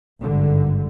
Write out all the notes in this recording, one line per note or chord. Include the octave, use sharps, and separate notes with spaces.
G#1 G2 D3